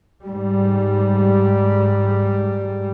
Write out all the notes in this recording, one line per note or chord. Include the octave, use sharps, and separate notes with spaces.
G#2 G3